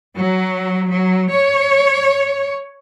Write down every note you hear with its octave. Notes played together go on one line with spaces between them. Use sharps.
F#3
F#3
C#5